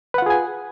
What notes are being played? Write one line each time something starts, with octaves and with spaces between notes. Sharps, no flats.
F4 G#4 B4 F#5 G#5